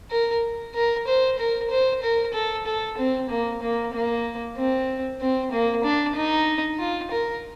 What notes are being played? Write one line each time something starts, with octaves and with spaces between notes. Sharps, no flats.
A#4
A#4
C5
A#4
C5
A#4
A4
A4
C4
A#3
A#3
A#3
C4
C4
A#3
D4
D#4
F4
A#4